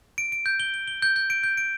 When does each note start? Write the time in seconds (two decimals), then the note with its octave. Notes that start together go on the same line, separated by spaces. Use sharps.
0.18 D7
0.32 D7
0.46 G6
0.60 G7
0.74 G7
0.88 G7
1.02 G6
1.16 G6
1.30 D7
1.43 G6
1.58 D7